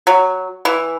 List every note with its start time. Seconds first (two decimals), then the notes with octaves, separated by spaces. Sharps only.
0.07 F#3
0.65 E3